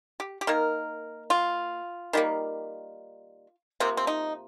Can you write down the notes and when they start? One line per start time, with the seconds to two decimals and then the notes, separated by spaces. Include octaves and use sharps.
0.20 G4
0.41 G4
0.47 D#3 A#3 A#4
1.30 F4
2.13 D#3 G3 A#3
3.80 C3 F3 A#3 C4
3.97 C4
4.07 D#4